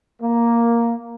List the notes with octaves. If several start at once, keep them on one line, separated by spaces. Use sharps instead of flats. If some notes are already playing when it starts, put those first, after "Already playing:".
A#3